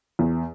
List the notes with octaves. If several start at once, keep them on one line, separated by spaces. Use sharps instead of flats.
E2